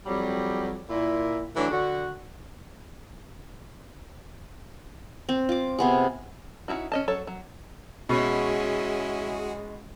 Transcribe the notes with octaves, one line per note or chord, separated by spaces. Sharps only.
F2 F#3 G3
A#2 E4
E3 F#3 A3 D4
D3 F#4
C4
F4 D6
C3 B3 G#4
C#4 D#4 E4 F#4
C#4 D#5 A5
F#3 A4 C#5
F#3
B2 G#3 C#4 E4 F#4 G#4